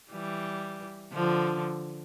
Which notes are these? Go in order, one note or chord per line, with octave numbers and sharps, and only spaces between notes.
E3 G3
D3 F3